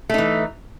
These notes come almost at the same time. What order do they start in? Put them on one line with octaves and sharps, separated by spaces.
A3 D#4 E3